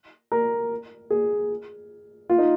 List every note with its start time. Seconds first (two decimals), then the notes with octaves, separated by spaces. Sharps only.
0.32 A#4
1.10 G#4
2.30 F4
2.38 D#4